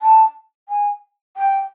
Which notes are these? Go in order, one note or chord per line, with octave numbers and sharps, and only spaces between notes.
A5
G#5
G5